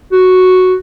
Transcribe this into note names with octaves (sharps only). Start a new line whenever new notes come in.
F#4